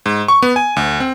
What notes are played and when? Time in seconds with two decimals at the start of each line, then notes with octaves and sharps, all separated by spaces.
0.06 G#2
0.28 C#6
0.42 B3
0.56 G#5
0.76 D2
1.00 C4